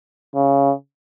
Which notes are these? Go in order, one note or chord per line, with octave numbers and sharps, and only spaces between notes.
C#3